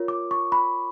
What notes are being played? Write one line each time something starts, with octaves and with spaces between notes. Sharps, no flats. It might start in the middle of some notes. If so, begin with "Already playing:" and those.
Already playing: F4 A#4 C#5
D6
C#6
B5